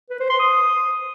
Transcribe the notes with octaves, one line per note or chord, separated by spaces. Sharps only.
B4
C5
C6
D#6